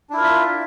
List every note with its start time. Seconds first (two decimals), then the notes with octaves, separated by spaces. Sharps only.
0.10 D4
0.13 E4
0.17 A#4
0.21 F4
0.24 E5